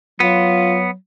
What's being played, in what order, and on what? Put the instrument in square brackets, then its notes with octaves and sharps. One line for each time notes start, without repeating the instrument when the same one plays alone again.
[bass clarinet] F#3 [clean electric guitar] B3 [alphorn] F4